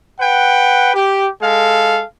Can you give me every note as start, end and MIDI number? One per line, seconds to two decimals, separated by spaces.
0.20 0.93 71
0.20 0.93 78
0.20 0.93 79
0.94 1.28 67
1.42 2.03 56
1.42 2.03 69
1.42 2.03 77